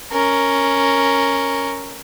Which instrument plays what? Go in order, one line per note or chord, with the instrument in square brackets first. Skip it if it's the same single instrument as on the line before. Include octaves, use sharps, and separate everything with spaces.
[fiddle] C#4 A#4